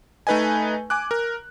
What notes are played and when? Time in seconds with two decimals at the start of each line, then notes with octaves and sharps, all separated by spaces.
0.27 A3 D#4 B4 D#5 G#5
0.90 G#5 D6 F#6
1.11 A#4